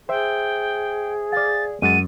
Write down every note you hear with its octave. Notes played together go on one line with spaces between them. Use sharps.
G#4 C5 E5 G5
D5 F5 A6
F#2 G#3 F#5 A6 D#7